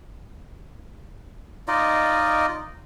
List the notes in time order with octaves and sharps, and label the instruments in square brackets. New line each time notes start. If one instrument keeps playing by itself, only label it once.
[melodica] D#4 F4 D5 D#5